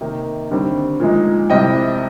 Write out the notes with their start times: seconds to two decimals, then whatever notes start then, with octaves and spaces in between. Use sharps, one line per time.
0.01 C3 D#3 A#3 D#4
0.51 D#2 D3 G3 C4
1.00 A#2 F3 G#3 D#4
1.50 C2 C3 G3 C4 D#5 G5